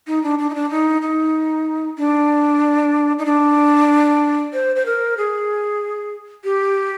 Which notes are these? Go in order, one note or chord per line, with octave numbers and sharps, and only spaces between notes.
D#4
D4
D4
D#4
D4
D#4
D#4
D4
D#4
D4
C5
C5
A#4
G#4
G4